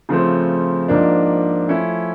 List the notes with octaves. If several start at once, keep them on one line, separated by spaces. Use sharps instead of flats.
C#3 F3 A3 C4
G#2 F3 A#3 D4
F3 A3 C#4 E4